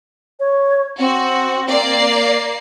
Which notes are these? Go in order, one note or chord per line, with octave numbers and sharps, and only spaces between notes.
C#5
C4 F#4
A#3 D5 C7